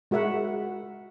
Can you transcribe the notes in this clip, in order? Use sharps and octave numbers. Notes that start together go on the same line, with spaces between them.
G#3 F#4 A#4 E5 F#5